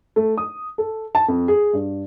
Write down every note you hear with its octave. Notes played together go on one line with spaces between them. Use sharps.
A3
D#6
A4
A5
F2
G#4
G2